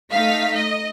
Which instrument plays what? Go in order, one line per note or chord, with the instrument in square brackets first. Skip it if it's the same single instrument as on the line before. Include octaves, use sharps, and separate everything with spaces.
[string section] A3 D#4 F5 B6
D#5